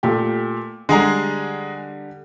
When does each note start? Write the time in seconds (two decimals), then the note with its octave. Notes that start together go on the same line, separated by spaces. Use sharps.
0.03 A#2 A3 G4
0.89 D3 G3 G#3 G#4 A#5